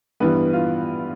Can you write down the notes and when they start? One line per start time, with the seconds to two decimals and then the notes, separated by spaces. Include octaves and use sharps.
0.20 G2 E3 G3 B3 B4
0.53 F4